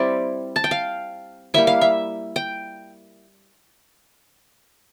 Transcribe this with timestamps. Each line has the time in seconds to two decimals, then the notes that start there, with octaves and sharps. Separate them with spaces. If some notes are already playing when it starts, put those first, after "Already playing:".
Already playing: G3 C4 E4 D5
0.56 A5
0.64 G5
0.71 F5
1.54 G3 A#3 E4 E5
1.67 F5
1.81 E5
2.36 G5